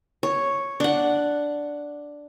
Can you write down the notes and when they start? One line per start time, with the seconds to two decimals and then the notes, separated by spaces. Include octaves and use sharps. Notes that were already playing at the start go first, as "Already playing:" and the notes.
0.23 C#5
0.80 D4 F#5